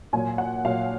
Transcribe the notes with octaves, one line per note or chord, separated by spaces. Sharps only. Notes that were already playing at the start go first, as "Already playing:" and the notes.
A#2 F#3 G#5
F#5
A#2 F#3 F5